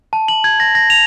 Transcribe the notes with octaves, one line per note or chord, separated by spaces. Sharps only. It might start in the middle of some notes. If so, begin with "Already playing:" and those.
A5
F#7
G#6
A#6
A#6
F7